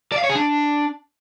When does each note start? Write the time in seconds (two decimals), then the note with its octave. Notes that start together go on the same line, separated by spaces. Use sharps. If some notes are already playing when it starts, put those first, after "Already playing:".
0.12 D5
0.18 F5
0.24 C#5
0.29 G#4
0.35 D4